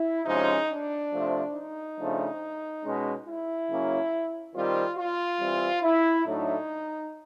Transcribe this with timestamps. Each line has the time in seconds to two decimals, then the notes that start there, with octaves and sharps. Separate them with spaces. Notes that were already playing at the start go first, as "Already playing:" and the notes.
Already playing: E4
0.25 C3 F3 G#3 C#4 D#4
0.69 D4
1.12 C3 F3 A3
1.54 D#4
1.98 C#3 F3 A3 D4
2.83 B2 G#3 C#4
3.25 E4
3.69 C#3 F#3 A#3 C#4
4.53 D#3 G3 C4 F4
4.97 F4
5.39 E3 G3 C4
5.82 E4
6.25 A2 F#3 A3 D4 D#4